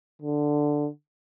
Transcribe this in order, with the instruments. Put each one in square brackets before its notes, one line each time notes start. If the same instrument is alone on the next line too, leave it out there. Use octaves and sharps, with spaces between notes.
[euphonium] D3